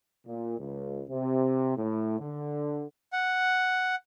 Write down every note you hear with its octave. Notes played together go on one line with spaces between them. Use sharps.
A#2
C#2
C3
A2
D3
F#5